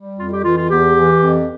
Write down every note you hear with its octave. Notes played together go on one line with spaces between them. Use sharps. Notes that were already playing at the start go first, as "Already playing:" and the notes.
Already playing: G3
F2 F4
G4
E3 F4
F4
E2 G4
E3
F2